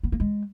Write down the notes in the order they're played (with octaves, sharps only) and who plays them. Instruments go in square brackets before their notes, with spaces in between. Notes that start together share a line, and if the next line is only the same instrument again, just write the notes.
[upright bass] B3
A#3
G#3